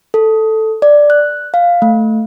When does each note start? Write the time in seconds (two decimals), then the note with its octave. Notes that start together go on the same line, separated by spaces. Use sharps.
0.14 A4
0.82 D5
1.10 F#6
1.54 F5
1.82 A3